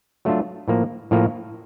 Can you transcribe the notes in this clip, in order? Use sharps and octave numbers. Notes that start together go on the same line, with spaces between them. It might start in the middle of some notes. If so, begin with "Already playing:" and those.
F#3 A3 D4 F4
A2 F3 A#3
A2 F3 A#3